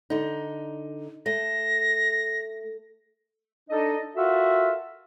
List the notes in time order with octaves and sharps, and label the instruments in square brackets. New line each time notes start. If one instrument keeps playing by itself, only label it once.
[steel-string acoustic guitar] D3 D#4
[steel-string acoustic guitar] A3 [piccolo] A#6
[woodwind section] D4 D#4 A4 D#5
F4 F#4 A4 A#4 E5